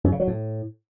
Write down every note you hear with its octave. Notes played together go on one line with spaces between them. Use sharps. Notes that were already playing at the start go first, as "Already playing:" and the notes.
F#2
C#3
F#3
A2